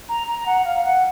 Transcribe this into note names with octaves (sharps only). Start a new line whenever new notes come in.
A#5
A#5
F#5
F5
F5
F#5